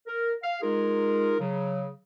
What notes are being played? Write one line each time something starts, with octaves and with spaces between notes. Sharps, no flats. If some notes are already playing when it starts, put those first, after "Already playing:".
A#4
F5
G#3 D#4 F4 G#4 A#4
C#3 F#3